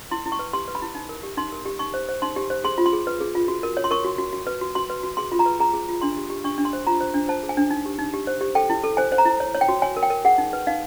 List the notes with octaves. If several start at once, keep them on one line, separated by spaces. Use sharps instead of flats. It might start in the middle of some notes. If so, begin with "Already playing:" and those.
E4 C6
E4
C#6
B4
G4 C6
B4
B5
E4
D#4
A#4
G4
D#4 C6
A#4
G4
D#4 C#6
C5
C5
D#4 C6
G4
C5
G#4 C6
F4
C6
G#4
B4
G#4
F4
F#4
A#4
C#5
C6
A#4 C#6
F#4
F#4
F#4
B4
F#4
F#4 C6
B4
F#4
G#4 C6
F4
A#5
B4
G#4 A#5
G#4
F4
D4 C6
G4
G4
D4 C#6
D4
C6
C5
F4 A#5
C5
D4
C5 A5
G#4
G#5
D4
D#4
G4
D#4
G4
C5
G4
A4 G5
E4
A4
C5 G#5
C5
A#5
E4
C#5
C#5
G5
F#4
C#5 G#5
A#4
G5
A#4
G#4 F#5
D#4
B4
D#4 F5